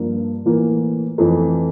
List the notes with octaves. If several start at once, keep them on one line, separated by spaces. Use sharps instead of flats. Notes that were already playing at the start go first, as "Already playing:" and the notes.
Already playing: G2 F3 A#3
A2 E3 A#3
F2 E3 A3